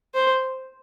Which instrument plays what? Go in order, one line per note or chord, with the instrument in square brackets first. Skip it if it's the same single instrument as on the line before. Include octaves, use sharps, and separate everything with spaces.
[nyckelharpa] C5